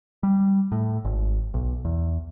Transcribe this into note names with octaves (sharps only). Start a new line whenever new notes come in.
G3
A2
G#1
B1
E2